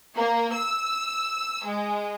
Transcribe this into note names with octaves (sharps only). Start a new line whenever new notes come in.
A#3
E6
G#3